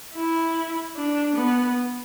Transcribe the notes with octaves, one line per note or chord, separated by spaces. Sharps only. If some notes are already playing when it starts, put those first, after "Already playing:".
E4
D4
B3